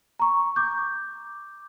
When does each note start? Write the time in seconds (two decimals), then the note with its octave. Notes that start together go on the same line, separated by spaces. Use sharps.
0.20 A#5 C#6
0.56 D6 G6